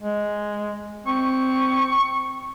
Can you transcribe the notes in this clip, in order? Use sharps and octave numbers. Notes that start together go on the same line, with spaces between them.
G#3
C4 C#6